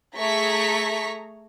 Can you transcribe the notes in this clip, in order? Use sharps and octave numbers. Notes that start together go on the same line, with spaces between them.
A3 G#4 A#5 C#6 B6